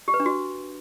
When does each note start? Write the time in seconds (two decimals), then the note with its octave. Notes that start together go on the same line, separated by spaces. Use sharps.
0.08 G4
0.14 B4
0.20 D4
0.26 F#4